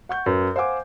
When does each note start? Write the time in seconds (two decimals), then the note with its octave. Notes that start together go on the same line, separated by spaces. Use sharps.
0.09 F#5 C#6 G6
0.26 F#2 B4
0.56 C5 F5 F#5 G#5 D6